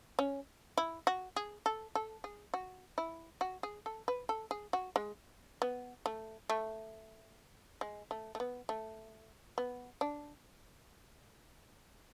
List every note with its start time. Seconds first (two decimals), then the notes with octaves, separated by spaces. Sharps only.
0.19 C#4
0.77 E4
1.07 F#4
1.36 G#4
1.66 A4
1.95 A4
2.24 G#4
2.54 F#4
2.98 E4
3.41 F#4
3.63 G#4
3.86 A4
4.08 B4
4.29 A4
4.51 G#4
4.73 F#4
4.96 G#3
5.62 B3
6.06 A3
6.50 A3
7.81 G#3
8.11 A3
8.35 A3
8.40 B3
8.69 A3
9.58 B3
10.01 D4